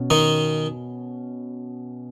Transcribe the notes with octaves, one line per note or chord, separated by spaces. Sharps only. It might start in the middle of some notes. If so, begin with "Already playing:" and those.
Already playing: B2 C#4
D#3 D#4